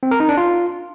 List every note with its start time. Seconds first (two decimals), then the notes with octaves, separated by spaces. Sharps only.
0.03 C4
0.11 A#4
0.20 D#4
0.29 D4
0.37 F4